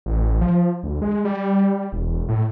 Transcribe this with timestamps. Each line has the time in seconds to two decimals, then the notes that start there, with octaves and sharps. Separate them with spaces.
0.06 A1
0.41 F3
0.83 D2
1.02 G#3
1.25 G3
1.92 E1
2.29 A2